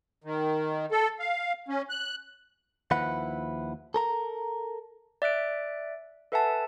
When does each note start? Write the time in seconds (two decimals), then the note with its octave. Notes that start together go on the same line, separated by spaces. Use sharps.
0.24 D#3
0.92 A4
1.19 F5
1.68 C#4
1.89 F#6
2.91 D#2 F3 E4 B4 F#5
3.94 A4 A#4 A#5
5.22 D5 E5 F#6 D7
6.32 A4 B4 E5 F#5 G#5 A5